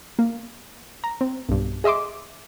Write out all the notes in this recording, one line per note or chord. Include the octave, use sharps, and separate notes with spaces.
A#3
A#5
C4
B1 G2
G#4 D#5 E5 C6 D6